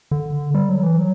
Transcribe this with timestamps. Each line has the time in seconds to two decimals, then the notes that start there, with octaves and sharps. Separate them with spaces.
0.11 D3
0.54 G3
0.69 F#3
0.83 E3
0.99 F#3